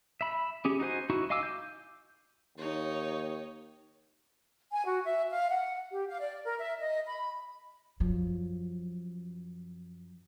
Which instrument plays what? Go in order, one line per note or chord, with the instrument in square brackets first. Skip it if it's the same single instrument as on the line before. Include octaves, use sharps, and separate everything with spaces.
[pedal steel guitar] E5 B5
C#4 G4 G#4
D#4 F#4 C5 G#5
D#4 E4 F#4
D#5 F5 G#5 D6 E6
G6
[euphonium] D#2 [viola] D#4 C#5
[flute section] G#5
F#4
E5
F5
F#5
G4
F5
D5
A#4
E5
D#5
B5
[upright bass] F#2 F3